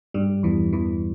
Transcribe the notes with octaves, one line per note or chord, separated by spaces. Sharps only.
G2 G3
E2 E3
E2 E3